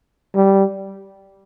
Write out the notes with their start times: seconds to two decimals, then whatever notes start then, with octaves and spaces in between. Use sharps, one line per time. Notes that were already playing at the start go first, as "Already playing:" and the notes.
0.35 G3